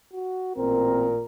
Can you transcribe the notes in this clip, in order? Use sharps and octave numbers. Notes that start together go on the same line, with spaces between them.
F#4
A1 A#2 C4 A#4